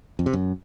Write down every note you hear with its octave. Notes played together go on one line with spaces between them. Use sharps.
F2
C3
F#2